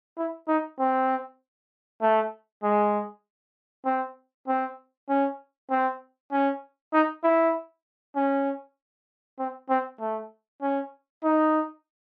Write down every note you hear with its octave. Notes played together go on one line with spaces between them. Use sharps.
E4
D#4
C4
A3
G#3
C4
C4
C#4
C4
C#4
D#4
E4
C#4
C4
C4
A3
C#4
D#4